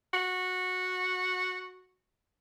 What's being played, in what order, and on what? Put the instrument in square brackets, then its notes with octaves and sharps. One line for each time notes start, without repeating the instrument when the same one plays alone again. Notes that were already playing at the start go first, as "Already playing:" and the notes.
[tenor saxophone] F#4